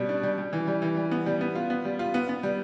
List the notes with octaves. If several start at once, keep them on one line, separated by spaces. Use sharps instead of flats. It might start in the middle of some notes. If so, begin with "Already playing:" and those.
Already playing: B2 G3
D4
G3
G3
E3
G3
E3
G3
B3
G3
B3
F4
B3
G3
F4
B3
B3
G3